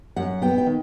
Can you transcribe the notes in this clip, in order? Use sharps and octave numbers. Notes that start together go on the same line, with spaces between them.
F#2 F#5
B3 G5
G5
D#3